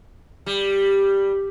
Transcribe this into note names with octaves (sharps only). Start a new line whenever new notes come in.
G3